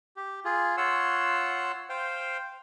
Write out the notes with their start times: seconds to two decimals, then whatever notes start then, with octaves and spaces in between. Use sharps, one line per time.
0.16 G4
0.45 F4 G#4
0.77 F4 C#5 F#5 C6 E6
1.90 C5 F5 G5